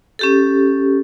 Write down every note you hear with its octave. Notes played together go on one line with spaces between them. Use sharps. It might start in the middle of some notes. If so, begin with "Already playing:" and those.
C#4 G4 A4